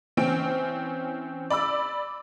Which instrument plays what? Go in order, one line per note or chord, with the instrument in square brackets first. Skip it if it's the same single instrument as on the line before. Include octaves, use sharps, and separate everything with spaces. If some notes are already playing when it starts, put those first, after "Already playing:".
[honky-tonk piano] E3 C4 C#4 D7
D5 B5 D6 E6